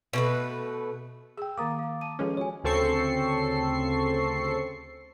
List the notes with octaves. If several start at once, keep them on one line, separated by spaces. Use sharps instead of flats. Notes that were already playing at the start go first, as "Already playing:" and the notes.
B2 A3 B4
G#4 G5 E6
D#3 A#3 A#4 F5 A#5 D6 D#6 A6
F5
A5 D#7
F3 G#3 C#4 A4 B4
F#4 C#5 G#5
D2 C#3 C4 A4 C#6 C7